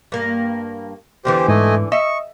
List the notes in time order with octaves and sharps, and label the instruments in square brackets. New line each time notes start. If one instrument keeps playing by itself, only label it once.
[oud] G2 A#3
[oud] E2 D3 E3 [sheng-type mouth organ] G4 C5
[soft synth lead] G#2 [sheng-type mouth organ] A3 D#5 G#5
[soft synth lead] D#5 [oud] E5 [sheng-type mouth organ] C#6